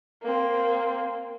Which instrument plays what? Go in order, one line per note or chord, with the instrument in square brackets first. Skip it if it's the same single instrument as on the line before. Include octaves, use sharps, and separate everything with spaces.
[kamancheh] A#3 C4